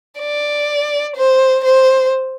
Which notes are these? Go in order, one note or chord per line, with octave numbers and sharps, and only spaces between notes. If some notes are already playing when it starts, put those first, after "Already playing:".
D5
C5
C5